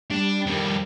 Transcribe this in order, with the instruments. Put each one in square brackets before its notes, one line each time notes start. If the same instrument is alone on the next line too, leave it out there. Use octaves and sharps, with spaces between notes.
[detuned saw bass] G3 [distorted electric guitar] D4
[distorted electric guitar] F2 D#3